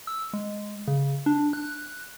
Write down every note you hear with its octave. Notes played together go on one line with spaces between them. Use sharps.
E6
G#3
C#3
D4
F#6